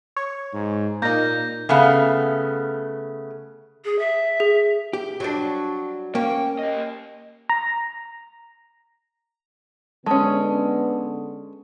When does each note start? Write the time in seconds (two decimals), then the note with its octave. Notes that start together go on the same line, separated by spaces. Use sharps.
0.17 C#5
0.54 G#2
1.02 A#2 A#3 D#4 G6 A#6
1.69 C#3 A3 B3 F5
3.85 G#4
3.99 E5
4.40 G#4
4.93 G4
5.20 F#3 G3 D4
6.15 A#3 C#4 G5
6.59 G4 D#5
7.49 A#5
10.06 D3 G#3 B3 C#4 A5 D#6